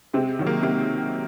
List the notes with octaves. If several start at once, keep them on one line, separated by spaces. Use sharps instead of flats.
C3 G#3 C4
D#3 F#3
A#3
C3 A#3